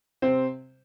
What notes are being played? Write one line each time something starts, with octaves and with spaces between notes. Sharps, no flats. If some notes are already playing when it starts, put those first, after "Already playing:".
C3 C4 C5